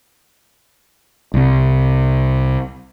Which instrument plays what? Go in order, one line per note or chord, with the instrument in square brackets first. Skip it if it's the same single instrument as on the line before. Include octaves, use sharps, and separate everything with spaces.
[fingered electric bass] C2 C3